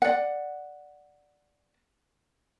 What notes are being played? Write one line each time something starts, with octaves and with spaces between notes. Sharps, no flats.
D5 F#5